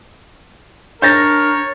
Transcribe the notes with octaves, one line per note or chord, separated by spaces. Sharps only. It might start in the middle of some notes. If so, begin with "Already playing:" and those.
D4 A#4 C#5 G6 A6 A#6